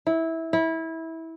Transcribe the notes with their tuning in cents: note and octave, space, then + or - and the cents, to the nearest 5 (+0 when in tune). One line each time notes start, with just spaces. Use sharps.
E4 -15
E4 -20